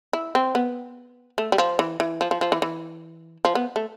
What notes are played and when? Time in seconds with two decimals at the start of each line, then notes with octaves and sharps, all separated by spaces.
0.13 E4
0.35 C4
0.55 B3
1.38 A3
1.52 G3
1.58 F3
1.79 E3
2.00 E3
2.21 F3
2.31 F3
2.41 F3
2.52 E3
2.62 E3
3.45 F3
3.55 B3
3.76 A3